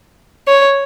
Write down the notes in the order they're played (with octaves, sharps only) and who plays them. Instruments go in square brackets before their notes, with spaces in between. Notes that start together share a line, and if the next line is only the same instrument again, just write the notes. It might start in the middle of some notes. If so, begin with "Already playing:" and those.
[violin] C#5